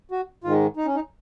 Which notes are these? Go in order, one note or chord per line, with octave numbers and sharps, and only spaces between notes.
F#4
G#2 D#3 G#3 F4
D#4
C#4
D#4